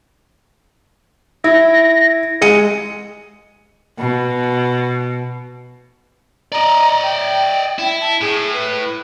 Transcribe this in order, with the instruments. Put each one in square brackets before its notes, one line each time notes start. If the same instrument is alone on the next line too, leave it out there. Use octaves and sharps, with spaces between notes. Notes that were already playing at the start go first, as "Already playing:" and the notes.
[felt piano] E4 [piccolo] A#6
[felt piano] G#3 C#7 D#7
[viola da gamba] B2
[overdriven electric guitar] D5 D#5 [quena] A#5
[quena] G5
[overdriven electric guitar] E4
[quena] A5
[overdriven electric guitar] A2 [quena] G#4
[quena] B4